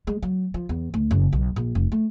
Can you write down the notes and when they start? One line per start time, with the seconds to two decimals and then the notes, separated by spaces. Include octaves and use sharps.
0.07 G#3
0.22 F#3
0.54 F3
0.69 E2
0.94 D2
1.11 F#1
1.33 B1
1.56 A#1
1.75 F1
1.92 A3